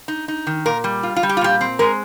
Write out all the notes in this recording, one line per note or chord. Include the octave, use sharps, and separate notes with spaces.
D#4
D#4
D#3
A#2 A#4
G3
F4
F4
G3
G4
F4
A#2 G4
C4
G#3 A#4